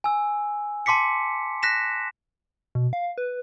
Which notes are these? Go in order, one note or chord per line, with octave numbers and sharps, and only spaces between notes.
G#5 E6
A5 C6 D6 B6 C#7
F#6 A#6 B6 E7
B2
F5
B4